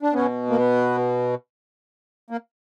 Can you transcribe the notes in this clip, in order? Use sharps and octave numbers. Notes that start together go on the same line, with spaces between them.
D4
B2 B3 C#4
A#3
B3
A#3